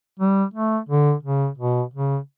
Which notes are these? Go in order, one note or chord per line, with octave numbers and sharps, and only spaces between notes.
G3
A3
D3
C#3
B2
C#3